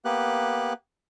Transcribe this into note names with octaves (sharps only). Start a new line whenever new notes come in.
A#3 B3 G4 F#6